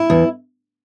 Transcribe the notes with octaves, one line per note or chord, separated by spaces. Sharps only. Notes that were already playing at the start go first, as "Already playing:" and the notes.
Already playing: E4
E2